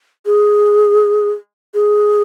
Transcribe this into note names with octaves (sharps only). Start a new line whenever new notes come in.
G#4
G#4